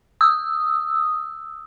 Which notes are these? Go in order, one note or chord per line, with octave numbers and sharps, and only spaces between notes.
D#6 E6